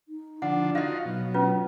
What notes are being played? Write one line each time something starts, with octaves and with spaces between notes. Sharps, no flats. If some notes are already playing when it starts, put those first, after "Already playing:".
D#4
D3 F3 D4 F#5
D#4 F4 F#4 D#5 F5
B2 F#3
C#4 F4 B4